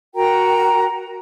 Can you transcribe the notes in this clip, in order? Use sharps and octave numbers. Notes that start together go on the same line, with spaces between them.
F#4 A#4 G5 A#5